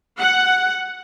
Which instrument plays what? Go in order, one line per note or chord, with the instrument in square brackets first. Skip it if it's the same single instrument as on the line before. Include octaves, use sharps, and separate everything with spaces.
[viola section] F#5